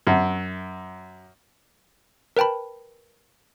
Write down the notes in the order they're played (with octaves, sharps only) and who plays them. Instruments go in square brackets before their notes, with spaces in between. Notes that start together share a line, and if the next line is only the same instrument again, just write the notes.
[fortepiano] F#2
[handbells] A#4 B4 G5 A5 B5